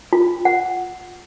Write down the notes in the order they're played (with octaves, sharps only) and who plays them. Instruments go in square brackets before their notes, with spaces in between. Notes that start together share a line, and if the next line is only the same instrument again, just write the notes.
[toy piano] F4
F#5